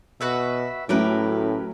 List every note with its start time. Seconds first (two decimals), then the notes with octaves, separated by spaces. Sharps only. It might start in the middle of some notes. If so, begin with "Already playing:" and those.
0.21 B2 F#4 B4 E5
0.89 A2 F#3 A3 C#4 G4 A#4 B4